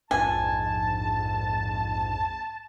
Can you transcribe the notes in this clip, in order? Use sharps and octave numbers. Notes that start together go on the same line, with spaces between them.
A#1 F2 G#2 G#5 A5